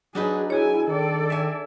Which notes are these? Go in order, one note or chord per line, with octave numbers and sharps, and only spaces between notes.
F#3 D4 D#4 G#4 B4
E4 G#4 C#5 G#5
D#3 A4 D5
E5 G#5